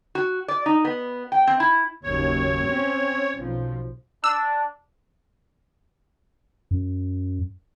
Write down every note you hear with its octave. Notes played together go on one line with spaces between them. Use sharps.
F#4
D5
D#4
B3
G5
C4
E4
F#1 D#2 C#5
C4 C#4
B1 F3
D4 E6
F#2